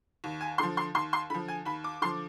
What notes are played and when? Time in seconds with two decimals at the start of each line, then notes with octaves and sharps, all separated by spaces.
0.24 D#2
0.41 G#5
0.58 D3 F3 C6
0.77 C6
0.95 D#2 C6
1.13 C6
1.30 D3 F3 B5
1.48 G#5
1.65 D#2 B5
1.84 D6
2.02 D3 F3 C6